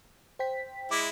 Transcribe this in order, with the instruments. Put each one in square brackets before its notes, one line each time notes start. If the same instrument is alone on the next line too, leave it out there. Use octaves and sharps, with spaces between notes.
[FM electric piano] C5 G5 B6
[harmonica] G#3 E4 [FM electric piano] D6